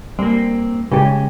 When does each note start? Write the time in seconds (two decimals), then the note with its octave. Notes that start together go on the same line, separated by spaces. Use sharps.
0.19 G3 A#3 C4
0.92 C#3 G#3 G4